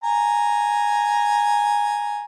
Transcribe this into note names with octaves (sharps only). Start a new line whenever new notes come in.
G#5 A#5